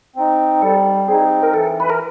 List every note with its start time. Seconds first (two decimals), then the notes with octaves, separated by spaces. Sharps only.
0.16 C4 D#4
0.61 G3 A4
1.08 C4 D#4 G#4
1.43 A#4
1.53 E3 A4
1.80 B4
1.90 A#4